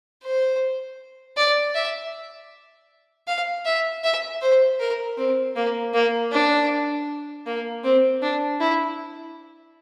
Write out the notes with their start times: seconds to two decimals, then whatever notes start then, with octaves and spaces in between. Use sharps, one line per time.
0.23 C5
1.37 D5
1.75 E5
3.27 F5
3.65 E5
4.03 E5
4.42 C5
4.80 A#4
5.17 C4
5.56 A#3
5.94 A#3
6.32 D4
7.46 A#3
7.84 C4
8.22 D4
8.60 E4